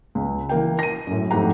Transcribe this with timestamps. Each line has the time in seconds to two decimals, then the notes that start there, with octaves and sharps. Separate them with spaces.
0.15 C#2
0.49 E3 A#3 G5
0.79 A#6 D#7
1.07 F#2 A2
1.31 F2 G#2 A3 G4 F#5 A#5